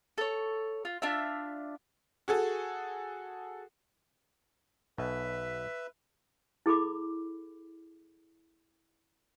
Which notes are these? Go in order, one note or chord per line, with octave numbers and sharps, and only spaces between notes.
A4 C#5
F4
D4 F4 E5
F#4 G#4 A4
B1 B2 B4 E5
E4 G#4 A4 B5 D6